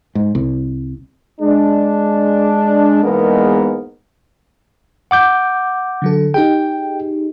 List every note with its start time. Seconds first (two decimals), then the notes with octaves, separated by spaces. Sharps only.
0.15 G#2
0.35 C2
1.40 G#3 D4
3.03 E2 G#2 G#3 A#3 B3 A#4
5.11 F#5 D6 G6
6.02 D3 F#3 A4
6.34 D#4 G4 G#4 G5